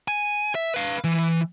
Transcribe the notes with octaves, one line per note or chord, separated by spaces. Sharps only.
G#5
E5
B4 F5
E3